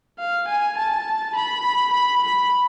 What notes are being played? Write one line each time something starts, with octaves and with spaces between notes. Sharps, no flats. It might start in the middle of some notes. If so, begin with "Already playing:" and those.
F5
G#5
A5
B5
B5
B5